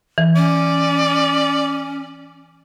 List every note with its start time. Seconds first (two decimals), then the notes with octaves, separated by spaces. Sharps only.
0.18 E3
0.36 C#4 D5